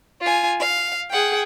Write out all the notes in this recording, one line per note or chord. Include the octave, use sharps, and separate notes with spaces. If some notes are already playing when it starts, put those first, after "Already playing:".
F4 G#5
F5
G#4 F#5 G5